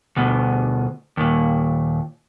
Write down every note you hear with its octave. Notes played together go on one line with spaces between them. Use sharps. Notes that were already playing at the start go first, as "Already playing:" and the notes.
D2 B2
D#2 A#2